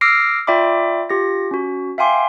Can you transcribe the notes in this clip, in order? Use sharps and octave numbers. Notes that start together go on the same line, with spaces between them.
D6 E6 F6 A#6 C7 D7
F4 D5 E5 G5 B5 D6
F4 G4 A#6
C#4 F#4
E5 F5 G5 G#5 C6 D6